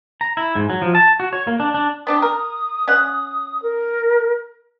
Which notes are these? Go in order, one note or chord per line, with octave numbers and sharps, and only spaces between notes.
A#5
E4
G#2
F#3
F3
A5
F#4
C#5
A#3
D4
D4
B3 D4 G4 D#6
A#4
C#4 F#5
A#4